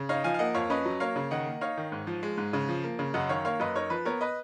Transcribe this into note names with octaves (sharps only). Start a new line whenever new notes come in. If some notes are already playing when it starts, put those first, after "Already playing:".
Already playing: C#3
D#4 C#5 F5
F3 F5 G#5
F5
A#3 D#5 F#5
F2 C#5 F5
C#4 B4 D#5
F#3
A#3 C#5 F5
C#3
D#3 D#5 F#5
A#3
D#4 C#5 F5
D#3
G#2
F3
G#3
G#2
C#3
F3
A#3
C#3
F#2 D#5 F#5
D#3 C#5 F5
A#3 C#5 F5
F#2 B4 D#5
D#4 A#4 C#5
F3 B4
B3 A#4 C#5
B4 D#5